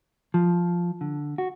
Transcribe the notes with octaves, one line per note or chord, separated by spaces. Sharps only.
F3
D3
F#4